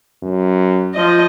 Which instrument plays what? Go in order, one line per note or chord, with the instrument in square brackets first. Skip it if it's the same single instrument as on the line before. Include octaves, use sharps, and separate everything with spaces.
[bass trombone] F#2
[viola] F3 D#5